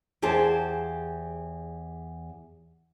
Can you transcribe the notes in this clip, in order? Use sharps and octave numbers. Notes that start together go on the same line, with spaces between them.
E2 G4 G#4 C5 A5